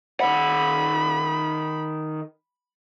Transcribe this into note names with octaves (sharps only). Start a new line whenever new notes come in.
D#3 F#5 B5